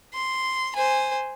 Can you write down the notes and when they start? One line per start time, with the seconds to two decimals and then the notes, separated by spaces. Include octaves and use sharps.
0.14 C6
0.76 C5 G#5